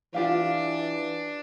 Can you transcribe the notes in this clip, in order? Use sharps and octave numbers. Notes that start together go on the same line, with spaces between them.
E3 D4 F4 G4 F5